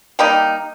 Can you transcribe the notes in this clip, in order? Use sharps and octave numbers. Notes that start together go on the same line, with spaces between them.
G3 A#3 D#4